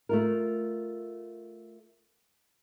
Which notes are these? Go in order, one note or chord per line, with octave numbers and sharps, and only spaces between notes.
A3 F4 A#4